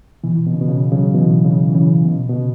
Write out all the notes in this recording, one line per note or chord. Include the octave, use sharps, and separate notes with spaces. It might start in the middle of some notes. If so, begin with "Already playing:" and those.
B2 E3
B2
C#3
B2
C#3
C#3 F#3
B2 E3
C#3
E3
C#3
B2
B2
C#3